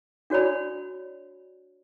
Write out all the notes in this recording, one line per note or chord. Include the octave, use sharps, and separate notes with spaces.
D4 F#4 C#5 D5 B5